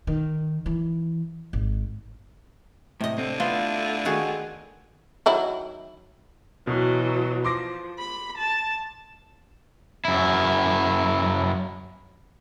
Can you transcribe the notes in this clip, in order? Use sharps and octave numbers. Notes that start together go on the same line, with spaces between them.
D#3
E3
G#1
A2 C3 D#5
D3 C4
A3 B3 D4 E4 F4
D#3 F#4 G#4
D#3 F#3 E4
B2 E3 F#3
F3 C6 D6 A#6
B5
A5
F#2 E4